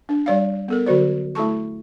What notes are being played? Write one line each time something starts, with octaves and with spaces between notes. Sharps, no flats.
D4
G3 D5 F5
B3 A4 A#4
D3 F#3 F#4 C5 D5
A3 E4 A4 A5 C#6